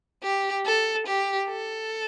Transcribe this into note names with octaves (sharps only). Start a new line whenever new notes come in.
G4
A4
G4
A4